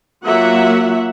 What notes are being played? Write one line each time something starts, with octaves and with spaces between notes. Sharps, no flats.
F#3 A#3 F4 F#4 E5 F#5